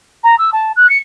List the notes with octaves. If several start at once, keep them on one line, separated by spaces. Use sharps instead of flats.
A#5
E6
A5
F#6
C#7